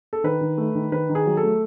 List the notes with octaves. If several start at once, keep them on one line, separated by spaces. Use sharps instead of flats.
A4
D#3 B4
D#3
A3
D#3
D#3 B4
D#3
G#4
F#3
A4
A3